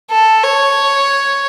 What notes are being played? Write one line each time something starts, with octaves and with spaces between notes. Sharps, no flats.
A4
C#5